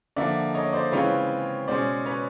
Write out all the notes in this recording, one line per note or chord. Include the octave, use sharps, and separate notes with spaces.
D3 F3 A#3 D5 E5
C#5 D#5
C5 D5
C#3 E3 G#3 C4 F4 B4 C#5
B2 G#3 C#4 C5 D5
B4 C#5